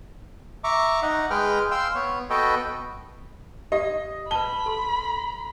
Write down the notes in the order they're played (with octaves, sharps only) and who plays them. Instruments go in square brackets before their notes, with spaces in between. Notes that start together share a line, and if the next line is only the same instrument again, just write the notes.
[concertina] E5 A#5 C#6 D6
D#4 D#5 F#5
G#3 G#4 B4 G5 F6
F5 G5 C6 E6
B3 C#5
B3 F#4 A4 B4 D#5 G5
[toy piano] G4 D5 F#5 [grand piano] D#5
[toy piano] B4 A5 [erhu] B5 [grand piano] G7
[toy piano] A4 C6